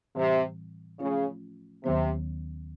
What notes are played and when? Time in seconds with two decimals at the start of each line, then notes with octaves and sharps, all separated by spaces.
0.15 A2 C3 E3 G3 C4
0.99 C#3 F3 A3 C#4 F4
1.84 D#2 C3 D#3 F#3 B3